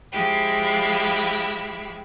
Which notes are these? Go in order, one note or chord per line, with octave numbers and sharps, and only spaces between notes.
F3 G#3 E4 G4